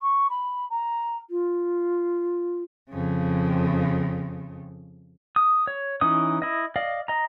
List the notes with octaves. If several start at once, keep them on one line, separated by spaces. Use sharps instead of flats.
C#6
B5
A#5
F4
F2 C#3
D#6
C#5
E3 C#4 D#4 D#6
E4 D#5
D5 D#5 F5
D#5 A#5